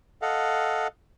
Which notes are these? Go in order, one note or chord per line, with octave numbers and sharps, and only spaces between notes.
A4 D#5 F5 F#5